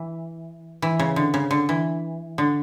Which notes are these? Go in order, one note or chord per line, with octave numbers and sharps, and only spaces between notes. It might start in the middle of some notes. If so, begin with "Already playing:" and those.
Already playing: E3
E3
C#3
D3
C#3
D3
E3
D3